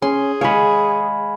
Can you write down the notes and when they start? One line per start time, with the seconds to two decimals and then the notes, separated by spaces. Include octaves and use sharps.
0.02 C#4 G#4 C6
0.41 G#3 C#5 F5 G#5 B5